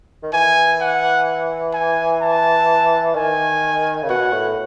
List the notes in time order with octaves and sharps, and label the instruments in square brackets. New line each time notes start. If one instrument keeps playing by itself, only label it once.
[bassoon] D#3
[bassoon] E3 [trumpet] G#5
[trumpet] F#5
G#5
A5
[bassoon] D#3 [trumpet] G#5
[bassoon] C#3
[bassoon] B2 [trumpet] F#5
[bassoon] A2